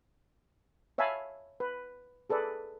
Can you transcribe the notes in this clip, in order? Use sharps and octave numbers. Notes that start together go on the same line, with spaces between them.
C#5 E5 F5 G#5 A5 B5
B4
G#4 A4 B4 D5